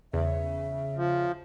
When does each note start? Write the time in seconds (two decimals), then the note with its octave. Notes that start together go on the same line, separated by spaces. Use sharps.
0.13 E2 C#3 E5
0.97 F3